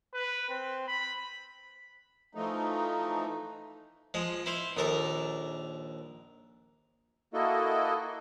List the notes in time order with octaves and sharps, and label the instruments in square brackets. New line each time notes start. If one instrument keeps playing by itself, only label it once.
[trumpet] B4
C4
B5
[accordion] E3 F3 A3 D#4
[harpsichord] F3 G#3 D#5
E4 C5 F5
A#1 D#2 A4 A#4 A#5
[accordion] A#3 E4 F#4 A4 D#5